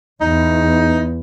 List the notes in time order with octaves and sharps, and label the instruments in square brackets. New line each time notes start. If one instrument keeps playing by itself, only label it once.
[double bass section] E2 [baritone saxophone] D#4